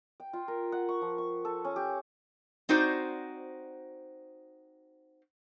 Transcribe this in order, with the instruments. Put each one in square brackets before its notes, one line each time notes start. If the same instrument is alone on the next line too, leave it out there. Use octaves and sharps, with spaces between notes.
[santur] G5
F4
A#4
F#5
C#6
F3
C#6
A4
C#4
G4
[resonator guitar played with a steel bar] C4 D#4 F#4 C5 D5